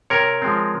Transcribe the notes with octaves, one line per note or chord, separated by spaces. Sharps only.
C3 A#4 C#5
F3 G#3 C4